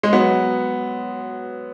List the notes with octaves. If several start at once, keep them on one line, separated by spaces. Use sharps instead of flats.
G#3
F#3 B3